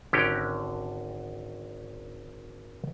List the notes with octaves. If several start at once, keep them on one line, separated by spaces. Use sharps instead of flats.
G#1 D3 C#4 G4 A#4 G5